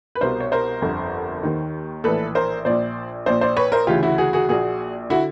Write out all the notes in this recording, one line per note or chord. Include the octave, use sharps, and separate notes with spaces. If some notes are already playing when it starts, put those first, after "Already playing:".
B4
C2 B2 A#4 C5
C#5
A#4 C5
G1 F2 D3
D#2 D#3
A#1 A2 E3 A4 B4
A#4 C5
A#1 A#2 C5 D5
A#1 A#2 C5 D5
C5 D5
B4 C#5
A#4 C5
D2 C#3 E3 F4 G4
E4 F#4
F#4 G#4
F#4 G#4
A#1 A#2 F#4 G#4
D3 E4 F#4